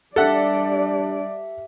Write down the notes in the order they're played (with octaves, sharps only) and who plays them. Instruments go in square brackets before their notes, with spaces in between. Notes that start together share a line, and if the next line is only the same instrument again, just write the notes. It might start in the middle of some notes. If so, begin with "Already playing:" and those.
[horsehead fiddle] G3 D5 [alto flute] D4 [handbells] G4 E5 [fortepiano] A4 F#5